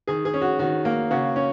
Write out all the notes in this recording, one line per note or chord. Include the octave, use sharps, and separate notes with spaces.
D#3 G#4
G#4
C#4
F#4
D#3 F#4
A#3
C#3 F#4
C#4